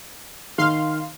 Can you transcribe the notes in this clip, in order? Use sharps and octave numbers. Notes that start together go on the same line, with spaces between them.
D#3 F5 C6 F6